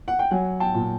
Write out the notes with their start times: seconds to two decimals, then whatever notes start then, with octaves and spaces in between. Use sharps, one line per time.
0.08 F#5
0.19 G5
0.31 F#3 F#5 G#5
0.60 G5 A5
0.74 A#2